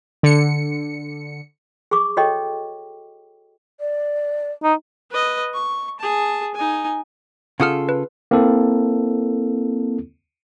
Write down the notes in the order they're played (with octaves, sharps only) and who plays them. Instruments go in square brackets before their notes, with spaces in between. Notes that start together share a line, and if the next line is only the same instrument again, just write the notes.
[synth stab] D3 C#7
[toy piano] G#4 C#6 D6
F#4 A4 C#5 D#5 G5 C#6
[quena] D5
[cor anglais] D#4
[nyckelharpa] B4 D#5
C#6
G#4 A5
D#4 G#5
[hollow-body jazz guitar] C#3 F4 A4 [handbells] F#5 D#6 F6
[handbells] B4
[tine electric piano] A#3 C4 E4 A4